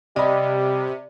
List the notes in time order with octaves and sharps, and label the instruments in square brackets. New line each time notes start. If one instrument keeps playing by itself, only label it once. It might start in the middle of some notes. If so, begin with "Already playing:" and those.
[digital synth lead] C3 [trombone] G3 [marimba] D5 [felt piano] D#5 B5